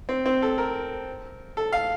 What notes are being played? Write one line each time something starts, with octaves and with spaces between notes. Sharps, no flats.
C4
C4
A4
A#4
A4
F5